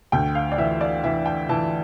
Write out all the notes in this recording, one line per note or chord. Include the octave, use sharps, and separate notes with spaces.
D2 G5
F5
D5
E3 E5
D5
E3 E5
G5
E3 A5